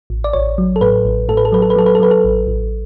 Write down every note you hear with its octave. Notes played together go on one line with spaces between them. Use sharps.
A1
D5
A1 C#5
F#3
A4
A2 B4
A1
A2 A4
B4
A4
F#3 B4
A4
B4
F#3 A4
B4
A4
F#3 B4
A4
A1
A1